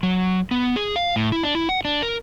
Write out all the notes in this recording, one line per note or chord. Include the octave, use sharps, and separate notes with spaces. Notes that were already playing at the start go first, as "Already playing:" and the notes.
F#3
B3
G#4
F5
A2
E4
D4
E4
F#5
D4
A#4